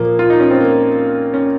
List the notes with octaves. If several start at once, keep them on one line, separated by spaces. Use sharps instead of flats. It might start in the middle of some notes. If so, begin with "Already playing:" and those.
Already playing: A#2 F3 A#3
F4
D#4
C#4
C4
A#3
C#4